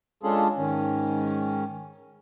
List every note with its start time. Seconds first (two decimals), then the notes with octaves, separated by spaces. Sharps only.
0.23 G#3 C#4 D4 F4 G#4 A4
0.57 G#2 D#3 C#4